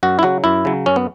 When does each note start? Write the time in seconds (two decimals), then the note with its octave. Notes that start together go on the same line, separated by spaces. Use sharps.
0.03 F#2 F#4
0.19 E4
0.23 C#3 F#3 F#4
0.44 F#2 E4
0.65 C#3 F#3
0.86 F#2 C#4
0.96 B3